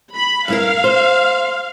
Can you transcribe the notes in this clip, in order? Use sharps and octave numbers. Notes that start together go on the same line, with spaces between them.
B5
G2 E4 A#4 F5
C5